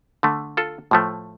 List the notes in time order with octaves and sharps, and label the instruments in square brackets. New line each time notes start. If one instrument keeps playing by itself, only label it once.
[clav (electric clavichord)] D3 A3
F4 A4
A2 F3 A3